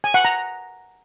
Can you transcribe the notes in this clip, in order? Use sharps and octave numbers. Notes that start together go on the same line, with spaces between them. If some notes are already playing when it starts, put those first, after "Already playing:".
G#5
F#5
A#5